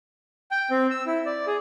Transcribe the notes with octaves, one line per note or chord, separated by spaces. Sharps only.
G5
C4
E6
E4
D5
G#4